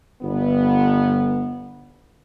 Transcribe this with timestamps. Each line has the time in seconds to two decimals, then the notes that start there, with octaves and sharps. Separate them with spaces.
0.22 G1 B3